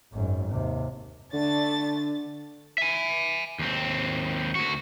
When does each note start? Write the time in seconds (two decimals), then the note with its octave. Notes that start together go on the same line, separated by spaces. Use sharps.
0.13 G#1 F#2
0.50 D#2 C3
1.34 D3 A3 D4 A6
2.78 E5 G#5
3.59 D#2 C4
4.55 D2 F#4